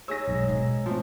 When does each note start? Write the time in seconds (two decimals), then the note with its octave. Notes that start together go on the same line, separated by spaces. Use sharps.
0.08 D#4 G#4 C#5 E6 A#6
0.28 B1 G#2
0.49 G#2 B2
0.86 F3 A3 C4